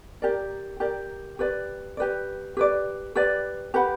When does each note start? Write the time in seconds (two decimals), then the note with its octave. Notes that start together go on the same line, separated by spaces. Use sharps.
0.22 G4 A#4 D5
0.80 G4 A#4 D5
1.39 G4 B4 D5
1.97 G4 B4 D5
2.57 G4 B4 D5
3.15 G4 B4 D5
3.74 G4 B4 F#5 B5